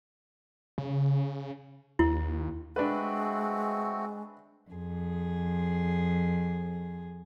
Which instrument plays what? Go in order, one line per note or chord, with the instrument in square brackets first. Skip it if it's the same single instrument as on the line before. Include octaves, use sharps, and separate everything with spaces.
[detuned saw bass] C#3
[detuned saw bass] D#2 [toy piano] E4
[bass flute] G#3 [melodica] A3 C4 F#4 [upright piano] D4 B4
[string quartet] F2 G#4